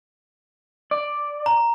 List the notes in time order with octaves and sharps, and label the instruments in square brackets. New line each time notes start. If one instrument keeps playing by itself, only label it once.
[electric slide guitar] D5
[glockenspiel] A#5